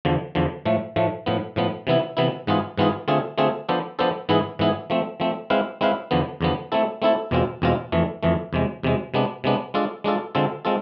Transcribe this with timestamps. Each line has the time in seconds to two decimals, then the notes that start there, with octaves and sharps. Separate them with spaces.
0.05 E2 D3 F3
0.35 E2 D3 F3
0.65 A2 F3 A3
0.96 A2 F3 A3
1.26 A2 F3 B3
1.56 A2 F3 B3
1.87 C3 E3 B3 E4
2.17 C3 E3 B3 E4
2.47 G#2 E3 B3 F4 G#4
2.78 G#2 E3 B3 F4 G#4
3.08 D3 A3 C4 F4 G#4
3.38 D3 A3 C4 F4 G#4
3.69 F3 B3 D4 A4 C5
3.99 F3 B3 D4 A4 C5
4.29 G#2 E3 B3 E4 G#4
4.59 G#2 E3 B3 E4 G#4
4.90 F3 A3 C4
5.20 F3 A3 C4
5.50 G#3 C4 E4 B4 F5
5.81 G#3 C4 E4 B4 F5
6.11 E2 D3 F3 B3
6.41 E2 D3 F3 B3
6.72 A3 C4 E4 A4
7.02 A3 C4 E4 A4
7.31 E2 B2 G#3 C4 F4
7.62 E2 B2 G#3 C4 F4
7.92 F2 E3 A3
8.23 F2 E3 A3
8.53 E2 C3 G#3
8.83 E2 C3 G#3
9.14 C3 G#3 B3 D4
9.44 C3 G#3 B3 D4
9.74 G#3 D4 F4 A4
10.04 G#3 D4 F4 A4
10.35 D3 G#3 C4 F4 A4
10.65 G#3 C4 F4 A4